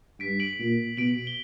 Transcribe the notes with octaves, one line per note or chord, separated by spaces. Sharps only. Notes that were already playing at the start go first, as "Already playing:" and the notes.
G2 B6 D7
D7 F#7
A#2
B2 D7 F#7
G7